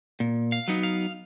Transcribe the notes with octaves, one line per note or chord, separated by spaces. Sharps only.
A#2
F5
F#3 B3 D#4
F5